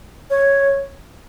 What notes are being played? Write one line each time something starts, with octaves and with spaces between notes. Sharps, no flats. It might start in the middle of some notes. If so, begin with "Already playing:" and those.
C#5